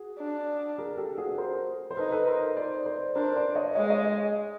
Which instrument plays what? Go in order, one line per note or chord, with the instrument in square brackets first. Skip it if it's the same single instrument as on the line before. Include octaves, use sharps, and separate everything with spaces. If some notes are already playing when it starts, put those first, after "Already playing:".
Already playing: [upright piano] F#4 G#4
[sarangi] D4
[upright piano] G#4 A#4
G4 A4
F#4 G#4
A#4 C5
C5
[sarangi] D#4 [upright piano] A4 B4
[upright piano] A4 B4
A#4 C5
C5 D5
C5 D5
[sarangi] D4 [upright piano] A#4 C5
[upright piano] C5 D5
C#5 D#5
[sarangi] G#3 [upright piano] C#5 D#5
[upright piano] C#5 D#5